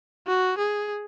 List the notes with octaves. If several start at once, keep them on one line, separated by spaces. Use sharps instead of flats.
F#4
G#4